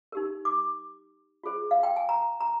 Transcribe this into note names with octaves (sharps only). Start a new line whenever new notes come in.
D#4 G4 A#4
D6
F4 G#4 C5
F5
G5
G#5
A#5
A#5